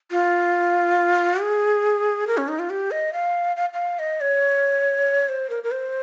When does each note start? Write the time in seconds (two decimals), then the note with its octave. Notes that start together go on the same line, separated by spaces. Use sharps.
0.11 F4
1.41 G#4
2.27 A#4
2.37 C#4
2.48 D#4
2.59 F4
2.70 G4
2.91 D#5
3.13 F5
3.57 F5
3.74 F5
3.99 D#5
4.21 C#5
5.29 C5
5.50 A#4
5.64 A#4
5.71 C5